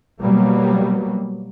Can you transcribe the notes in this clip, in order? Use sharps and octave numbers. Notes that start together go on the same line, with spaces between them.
B2 F#3 G3 A#3